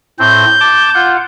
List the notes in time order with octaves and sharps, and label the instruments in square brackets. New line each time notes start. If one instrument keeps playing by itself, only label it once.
[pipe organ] A2 C4 [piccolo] G6
[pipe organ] A5 D6
F4 F#5